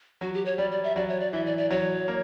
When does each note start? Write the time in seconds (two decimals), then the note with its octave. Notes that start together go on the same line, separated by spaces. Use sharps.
0.21 F#3 F#4
0.34 G4
0.46 C#5
0.58 G3 D5
0.71 D5
0.84 E5
0.96 F#3 D5
1.09 C#5
1.20 D5
1.33 E3 E5
1.46 D5
1.57 D5
1.70 F#3 C#5
2.08 A#3